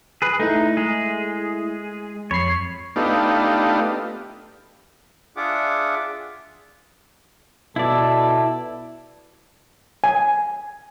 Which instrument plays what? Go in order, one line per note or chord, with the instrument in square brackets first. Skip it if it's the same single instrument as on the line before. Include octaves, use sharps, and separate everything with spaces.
[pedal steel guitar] G#4 B4
[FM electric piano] A3 E4 [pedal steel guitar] D#4
[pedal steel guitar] G#3 G#4
[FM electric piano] F2 B5 C7 [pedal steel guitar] C#5
[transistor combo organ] A3 B3 D4 D#4 F4 G4
[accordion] D4 F4 G#4 E5 F#5 D6
[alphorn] B2 [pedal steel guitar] E4 D5 [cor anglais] A4
[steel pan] G#5